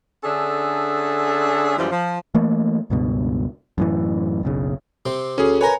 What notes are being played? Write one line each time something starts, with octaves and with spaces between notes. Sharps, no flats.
D3 C#4 D4 G#4 A4 E5
F#2 E3 F3 G3 G#3
F3
E3 A3 A#3
C#2 G2 B2
F#2 A2 E3
F#1 B1 C#3
C3 C4
D2 C#4 G#4
A#4 B4 C#5 G#5 A#5